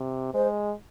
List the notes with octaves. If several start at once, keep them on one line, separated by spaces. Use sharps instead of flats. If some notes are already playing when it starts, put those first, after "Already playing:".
Already playing: C3
G#3 C5